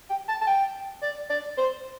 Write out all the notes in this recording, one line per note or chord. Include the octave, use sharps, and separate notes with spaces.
G5
A5
A5
G5
D5
D5
C5